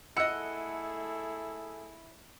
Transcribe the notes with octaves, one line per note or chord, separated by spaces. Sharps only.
A3 E4 G#4 A4 D#5 F#5 E6 C#7